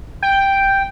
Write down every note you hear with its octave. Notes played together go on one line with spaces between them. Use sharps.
G5